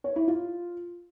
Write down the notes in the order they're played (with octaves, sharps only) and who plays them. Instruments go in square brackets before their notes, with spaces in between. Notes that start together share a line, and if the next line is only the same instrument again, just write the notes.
[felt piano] C#5
E4
F4